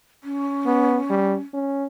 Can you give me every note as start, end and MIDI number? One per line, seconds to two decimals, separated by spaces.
0.24 1.41 61
0.66 0.98 59
1.10 1.36 55
1.54 1.87 61